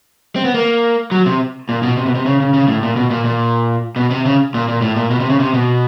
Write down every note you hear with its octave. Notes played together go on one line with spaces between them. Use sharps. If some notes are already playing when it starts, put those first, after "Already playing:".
C4
B3
A#3
F#3
C3
A#2
B2
C3
B2
C3
C#3
C#3
C#3
A2
A#2
B2
A#2
A#2
B2
C3
C#3
A#2
A#2
A2
A#2
B2
C3
C#3
C3
B2